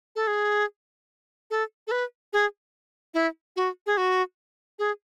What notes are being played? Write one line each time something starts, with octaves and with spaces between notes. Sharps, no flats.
A4
G#4
A4
A4
B4
G#4
E4
F#4
G#4
F#4
G#4